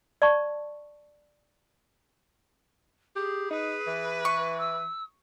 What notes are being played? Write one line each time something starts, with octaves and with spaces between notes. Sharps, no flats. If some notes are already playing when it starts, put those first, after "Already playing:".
D5 A5 C#6
G4 G#4
D#4 B4
E3
C#6
E6